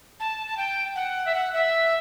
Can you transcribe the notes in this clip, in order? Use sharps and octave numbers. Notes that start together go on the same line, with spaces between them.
A5
A5
G5
F#5
E5
F#5
E5